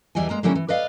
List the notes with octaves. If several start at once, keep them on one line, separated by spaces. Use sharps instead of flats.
E2 E3 G3 D#5 G#5
G#3 A#3 A#5
D3 F#3 G3 A#3 C#4 E4
E3
B4 D5 D#5 F5